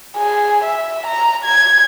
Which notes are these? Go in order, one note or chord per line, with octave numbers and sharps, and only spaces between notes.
G#4
E5
A#5
G#6